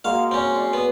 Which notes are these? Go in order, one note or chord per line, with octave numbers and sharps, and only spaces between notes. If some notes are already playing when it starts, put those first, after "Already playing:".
G#3 A#3 F#4 F5
C4 C#4
G#4 D5
B3